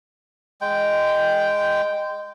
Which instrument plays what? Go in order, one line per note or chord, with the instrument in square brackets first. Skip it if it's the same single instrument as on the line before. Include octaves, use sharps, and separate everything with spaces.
[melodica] G#3 G5